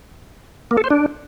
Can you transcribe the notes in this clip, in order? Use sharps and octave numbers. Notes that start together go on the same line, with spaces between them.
A#3
A4
C5
D4